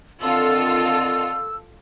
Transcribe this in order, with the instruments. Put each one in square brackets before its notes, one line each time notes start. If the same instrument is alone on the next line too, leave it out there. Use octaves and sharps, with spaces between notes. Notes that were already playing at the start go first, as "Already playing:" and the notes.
[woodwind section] D3 D#3 C4 [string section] F4 A4 [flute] E6